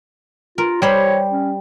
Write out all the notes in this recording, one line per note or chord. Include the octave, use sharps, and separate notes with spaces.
F4 A#4
G3 C5 C#5 B5
C#4